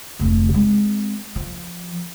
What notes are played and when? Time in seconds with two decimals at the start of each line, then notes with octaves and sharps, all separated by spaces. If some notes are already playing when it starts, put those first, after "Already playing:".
0.19 F1 D2
0.54 G#3 C4
1.36 F3